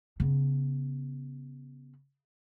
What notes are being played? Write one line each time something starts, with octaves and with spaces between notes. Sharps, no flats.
C#3 B3